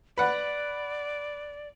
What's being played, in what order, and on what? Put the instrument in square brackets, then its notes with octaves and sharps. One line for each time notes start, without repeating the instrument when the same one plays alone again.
[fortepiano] B4 F#5 [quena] D5